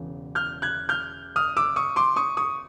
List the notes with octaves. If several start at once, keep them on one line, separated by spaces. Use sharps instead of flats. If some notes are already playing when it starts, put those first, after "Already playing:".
Already playing: E1 E2 C#3
F6 G6
F#6 G#6
F6 G6
D#6 F6
D6 E6
C#6 D#6
C6 D6
C#6 D#6
C#6 D#6